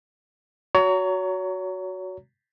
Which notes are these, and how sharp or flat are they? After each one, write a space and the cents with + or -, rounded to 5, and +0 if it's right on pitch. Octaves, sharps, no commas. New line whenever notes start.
F#4 +0 C#5 +30 A#5 -15